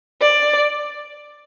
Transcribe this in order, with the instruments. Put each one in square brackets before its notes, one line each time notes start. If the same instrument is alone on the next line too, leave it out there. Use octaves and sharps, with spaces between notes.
[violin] D5